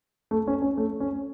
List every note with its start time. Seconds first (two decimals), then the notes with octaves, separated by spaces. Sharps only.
0.31 A3
0.47 C#4
0.62 C#4
0.77 A3
1.00 C#4